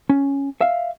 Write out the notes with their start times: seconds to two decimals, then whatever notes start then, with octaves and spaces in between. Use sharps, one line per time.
0.09 C#4
0.61 E5 F5